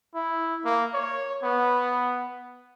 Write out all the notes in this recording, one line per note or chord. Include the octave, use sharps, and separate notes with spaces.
E4
A#3
C#5
B3